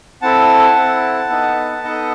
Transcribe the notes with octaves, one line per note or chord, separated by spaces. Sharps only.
C4 E4 A4 F#5 A5
C4 E4 A4
B3 D#4 A4
B3 D#4 A4 D#5 F#5